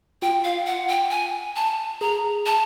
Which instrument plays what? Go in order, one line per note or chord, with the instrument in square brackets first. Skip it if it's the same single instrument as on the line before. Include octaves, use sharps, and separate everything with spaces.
[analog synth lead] F4 [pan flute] G5
[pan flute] F5
F#5
G5
G#5
A5
[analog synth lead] G#4 [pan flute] A#5
[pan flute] A5